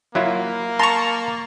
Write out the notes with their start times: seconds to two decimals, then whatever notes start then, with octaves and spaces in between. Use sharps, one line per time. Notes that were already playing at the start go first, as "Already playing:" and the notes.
0.15 F#3 A#3 E4 F4
0.79 A5 A#5 C6 C#6